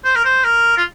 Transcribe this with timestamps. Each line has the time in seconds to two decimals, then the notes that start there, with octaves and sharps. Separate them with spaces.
0.04 C5
0.15 A#4
0.25 C5
0.44 A#4
0.77 F4